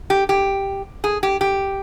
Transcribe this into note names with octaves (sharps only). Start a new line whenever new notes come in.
G4
G4
G#4
G4
G4